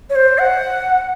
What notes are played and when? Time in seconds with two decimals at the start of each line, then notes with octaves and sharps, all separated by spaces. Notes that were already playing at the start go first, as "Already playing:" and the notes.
0.10 C#5
0.15 C5
0.39 F#5